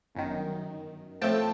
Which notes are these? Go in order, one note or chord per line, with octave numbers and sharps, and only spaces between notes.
G1 F#2 D#3
A2 F3 A3 C4 G5 A5